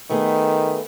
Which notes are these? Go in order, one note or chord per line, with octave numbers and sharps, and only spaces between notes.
D#3 A3 B3 G#4